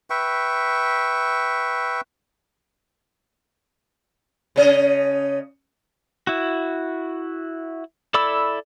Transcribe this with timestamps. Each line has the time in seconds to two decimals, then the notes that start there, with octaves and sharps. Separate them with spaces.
0.10 B4 E5 G5 C#6
4.56 C#3 C#4 D#5
6.27 E4 F#4
8.14 E4 A4 D5 B5 E6